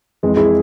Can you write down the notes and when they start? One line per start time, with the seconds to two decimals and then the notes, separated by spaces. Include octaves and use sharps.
0.23 F2 E3 G#3
0.37 E4 G#4